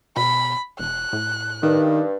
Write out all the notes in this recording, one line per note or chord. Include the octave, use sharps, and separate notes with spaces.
B2 B5
E1 F#6
A2
G2 D#3